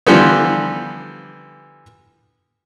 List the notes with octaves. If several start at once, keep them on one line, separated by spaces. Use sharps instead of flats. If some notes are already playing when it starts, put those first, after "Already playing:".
D3 E3 F3 G3 B3